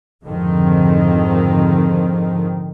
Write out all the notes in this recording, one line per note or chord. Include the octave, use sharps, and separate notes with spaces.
F2 G#2 D3 D#3 F3 C4